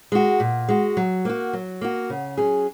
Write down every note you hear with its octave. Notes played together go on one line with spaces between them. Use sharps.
G#3 F#4
A#2
G#3 F#4
F#3
A#3 F#4
F#3
A#3 F#4
C#3
F#3 C#4 G#4